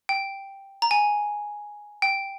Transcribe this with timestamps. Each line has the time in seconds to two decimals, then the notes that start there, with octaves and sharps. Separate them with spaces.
0.09 G5
0.82 A#5
0.91 G#5
2.02 G5